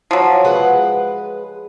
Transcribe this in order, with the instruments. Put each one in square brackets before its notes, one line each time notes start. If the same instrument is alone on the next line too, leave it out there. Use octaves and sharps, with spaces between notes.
[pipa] F3 F#3
[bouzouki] G#3 B4 F#5